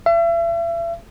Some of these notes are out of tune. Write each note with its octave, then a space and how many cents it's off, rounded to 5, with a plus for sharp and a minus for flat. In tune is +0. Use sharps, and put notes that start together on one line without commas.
E5 +40